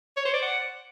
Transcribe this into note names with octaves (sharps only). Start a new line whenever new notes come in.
C#5
C5
D5
F#5